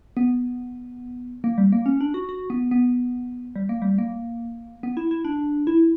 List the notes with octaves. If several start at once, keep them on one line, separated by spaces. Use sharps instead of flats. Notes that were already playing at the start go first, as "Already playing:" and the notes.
B3
A#3
G3
A#3
C#4
D4
F#4
F#4
B3
B3
G3
A#3
G3
A#3
B3
E4
E4
D4
E4